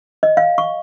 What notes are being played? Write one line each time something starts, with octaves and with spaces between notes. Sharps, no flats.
D#5
F5
C#6